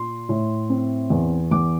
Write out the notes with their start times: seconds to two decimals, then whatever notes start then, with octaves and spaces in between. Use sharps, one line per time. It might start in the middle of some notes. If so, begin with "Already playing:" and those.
Already playing: A#2 C6
0.29 A2
0.70 C4
1.10 E2
1.51 E2 D6